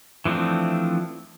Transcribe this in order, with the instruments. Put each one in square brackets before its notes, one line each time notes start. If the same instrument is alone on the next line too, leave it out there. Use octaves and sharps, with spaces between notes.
[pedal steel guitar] E3 F3 A3 C4 D4